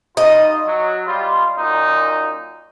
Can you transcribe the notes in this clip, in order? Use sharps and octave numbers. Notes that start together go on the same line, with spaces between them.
G3 D#4 F4 D#5
F#3
G3 F4
F#2 A#2 D#4